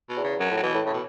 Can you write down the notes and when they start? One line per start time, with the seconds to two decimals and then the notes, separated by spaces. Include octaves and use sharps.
0.09 B2
0.17 E2
0.24 C#3
0.39 F#2 F#3
0.51 A2
0.57 F#3
0.63 B2 E3
0.74 A2
0.85 A2 C#3
0.94 B2